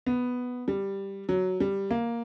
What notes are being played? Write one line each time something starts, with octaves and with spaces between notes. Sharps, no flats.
B3
G3
F#3
G3
A#3